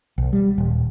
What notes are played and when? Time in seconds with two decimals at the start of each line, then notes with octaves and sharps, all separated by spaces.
0.18 B1
0.33 G3
0.58 D#1